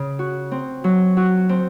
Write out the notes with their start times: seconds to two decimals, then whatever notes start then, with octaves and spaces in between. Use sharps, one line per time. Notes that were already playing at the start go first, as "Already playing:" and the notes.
Already playing: C#3
0.19 F#4
0.51 C4
0.84 F#3
1.17 F#4
1.49 C4